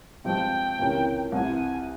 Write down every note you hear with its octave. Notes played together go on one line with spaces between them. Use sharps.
G2 F3 G#3 C4 G5
C#2 C3 E3 A#3 C#4
C2 C3 E3 G#5